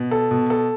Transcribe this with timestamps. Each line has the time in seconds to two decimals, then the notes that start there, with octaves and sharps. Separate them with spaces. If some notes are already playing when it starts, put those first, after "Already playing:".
Already playing: B2
0.11 A4
0.31 B2
0.50 A4